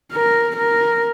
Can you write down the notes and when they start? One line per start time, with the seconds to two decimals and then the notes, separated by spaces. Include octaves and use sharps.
0.12 A#4
0.56 A#4